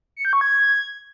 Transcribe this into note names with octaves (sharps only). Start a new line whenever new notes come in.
C#7
G6
C#6
G#6